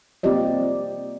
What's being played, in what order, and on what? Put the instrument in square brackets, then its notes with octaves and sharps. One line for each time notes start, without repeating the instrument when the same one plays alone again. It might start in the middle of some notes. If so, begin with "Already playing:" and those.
[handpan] A#3 C4 F4 G4 D5 D#5